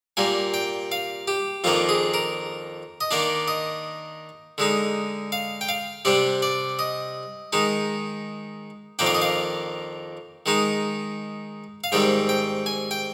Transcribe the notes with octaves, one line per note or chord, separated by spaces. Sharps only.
A#2 G3 A#3 G#5
G5
F5
G4
F2 D#3 A#3 D4 F4
G#4
A#4
D#5
D#3 A#3 D4 D5
D#5
D3 G#3 D#4
F5
G5
F5
C3 G3 D4 D5
D5
D#5
D#3 G#3 D#4
F2 D#3 A#3 D4 G5
F5
D#5
F5
D#3 G#3 D#4
F5
G#2 D#3 G3 C4 G5
G5
G#5
G5